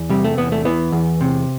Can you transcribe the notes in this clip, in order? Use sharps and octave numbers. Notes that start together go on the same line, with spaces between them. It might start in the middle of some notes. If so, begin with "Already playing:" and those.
Already playing: E2
C3 G3
A3
E2 B3
A3
E3 B3
E2
C3